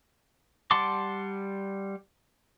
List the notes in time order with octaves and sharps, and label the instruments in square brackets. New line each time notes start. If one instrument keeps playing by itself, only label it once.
[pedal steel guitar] G3 F#5 A5 C6 D6